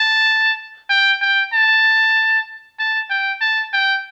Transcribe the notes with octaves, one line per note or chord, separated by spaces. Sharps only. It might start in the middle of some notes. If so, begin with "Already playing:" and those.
Already playing: A5
G5
G5
A5
A5
G5
A5
G5